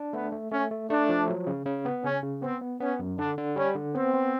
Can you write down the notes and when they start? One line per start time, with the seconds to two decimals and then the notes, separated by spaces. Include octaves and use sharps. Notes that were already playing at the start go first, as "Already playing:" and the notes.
Already playing: D4
0.13 A3 B3
0.32 A3
0.52 A3 C#4
0.71 A3
0.90 A3 D4
1.09 F3
1.28 F#3
1.47 C#3
1.66 C#3
1.85 B3
2.04 C#3 C#4
2.23 C#3
2.42 B3 C4
2.61 B3
2.80 B3 C#4
2.99 F#2
3.18 D3 D4
3.38 D3
3.56 G3 C#4
3.75 D3
3.95 B3 C4
4.14 B3